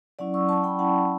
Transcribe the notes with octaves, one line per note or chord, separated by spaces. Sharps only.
F#3 C#4 E4 D5 F#5
C#6 E6
A5 C#6
G5 B5
F#3 C#4 E4 F#5 A5